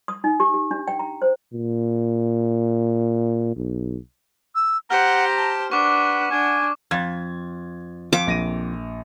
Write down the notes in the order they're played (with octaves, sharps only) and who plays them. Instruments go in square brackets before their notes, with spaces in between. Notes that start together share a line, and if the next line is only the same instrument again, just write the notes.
[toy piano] D#6
D#4
G4
G4
D4
G5
A#5
C5
[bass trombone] A#2
B1
[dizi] E6
[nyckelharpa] G4 C5 [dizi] F#5 [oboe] A#5 [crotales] F6
[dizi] A5
[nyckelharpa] D4 [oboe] B4 [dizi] F#5 [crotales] C#6 D6
[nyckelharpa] D4 [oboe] G#5
[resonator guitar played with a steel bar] F2 [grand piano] G#6 A6
[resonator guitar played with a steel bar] F2 [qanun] D6
[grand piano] A#1 A#6 D#7